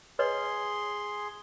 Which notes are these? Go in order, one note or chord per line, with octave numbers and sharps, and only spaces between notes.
G#4 B4 C#5 D#5 C6